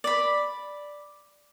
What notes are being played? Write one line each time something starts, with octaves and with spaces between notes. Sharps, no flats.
D5 B5